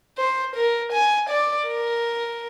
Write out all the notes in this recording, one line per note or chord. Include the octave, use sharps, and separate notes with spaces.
C5
A#4
G#5
D5
A#4